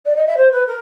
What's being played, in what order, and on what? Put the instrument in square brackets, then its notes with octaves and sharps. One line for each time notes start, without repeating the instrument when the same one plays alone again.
[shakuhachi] D5
D#5
E5
C5
B4
A#4